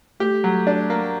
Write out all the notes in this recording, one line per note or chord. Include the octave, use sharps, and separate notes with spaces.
A3 G4
F#3
D4
A#3